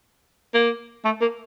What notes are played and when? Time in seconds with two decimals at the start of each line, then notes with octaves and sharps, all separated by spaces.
0.54 A#3
1.05 A3
1.21 A#3